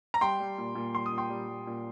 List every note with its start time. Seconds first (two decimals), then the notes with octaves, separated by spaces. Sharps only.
0.14 A#5
0.21 G3 G5 C6
0.40 G3
0.58 A#2
0.75 A#2
0.94 G3 C6
1.06 D#6
1.12 A#2
1.18 G5 C6
1.30 G3
1.48 G3
1.67 A#2